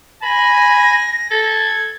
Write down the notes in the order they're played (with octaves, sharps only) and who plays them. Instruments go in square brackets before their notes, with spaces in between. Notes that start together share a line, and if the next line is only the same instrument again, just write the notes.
[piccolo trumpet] G#5 [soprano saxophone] B5 [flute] A#6
[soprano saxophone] A4 [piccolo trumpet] G#6